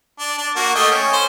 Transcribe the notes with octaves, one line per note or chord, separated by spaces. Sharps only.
D4
D4
A#3 F#4
A3 D#5 G5
C#4
C5